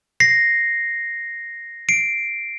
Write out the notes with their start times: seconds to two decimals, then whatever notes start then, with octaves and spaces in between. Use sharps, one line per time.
0.20 A#6 C7
1.89 C7 D7